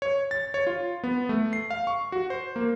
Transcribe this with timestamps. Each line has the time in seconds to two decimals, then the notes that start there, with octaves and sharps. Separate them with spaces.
0.02 C#5
0.31 A6
0.54 C#5
0.67 F4
1.04 B3
1.29 A3
1.53 C7
1.70 F5
1.87 C#6
2.12 F#4
2.30 C5
2.56 A#3